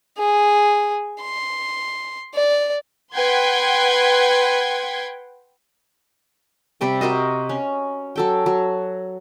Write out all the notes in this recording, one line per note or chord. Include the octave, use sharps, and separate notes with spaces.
G#4
C6
D5
B4 F#5 G5 C6 G#6
C3 G3 D5 G5
F#4 A#4 C5 D#5
C#4
F#3 A4 G5
F#3